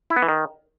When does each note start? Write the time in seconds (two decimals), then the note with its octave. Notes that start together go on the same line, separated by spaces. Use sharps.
0.10 E4
0.16 B3
0.22 E3
0.29 D#3